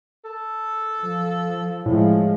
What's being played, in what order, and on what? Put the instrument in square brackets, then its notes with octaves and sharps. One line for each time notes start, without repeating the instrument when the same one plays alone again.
[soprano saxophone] A4
[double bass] F3
[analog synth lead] A2 [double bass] F3 G#3